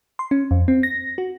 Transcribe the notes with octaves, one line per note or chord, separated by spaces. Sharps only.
C6
C#4
F2
C4
A#6
F#4